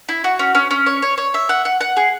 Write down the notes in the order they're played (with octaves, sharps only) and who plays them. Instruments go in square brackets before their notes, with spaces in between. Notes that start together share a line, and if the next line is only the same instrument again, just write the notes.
[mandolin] E4
F#4
C#4
C#4
C#4
C#5
C#5
C#5
E5
F#5
F#5
F#5
G#4